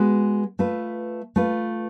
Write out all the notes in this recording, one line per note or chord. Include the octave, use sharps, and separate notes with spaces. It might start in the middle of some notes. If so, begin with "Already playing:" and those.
Already playing: G#3 B3 F#4 B4
A3 F4 B4
A3 F4 B4